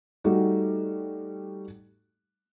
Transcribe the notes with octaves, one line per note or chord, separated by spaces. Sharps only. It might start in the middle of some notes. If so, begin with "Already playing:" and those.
G3 A3 D#4 F#4